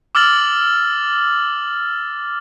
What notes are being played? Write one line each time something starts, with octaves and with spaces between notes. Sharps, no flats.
D6 E6 F6 A6 F#7